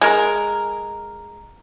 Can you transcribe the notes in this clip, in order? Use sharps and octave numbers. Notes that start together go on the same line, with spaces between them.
G#3 A#4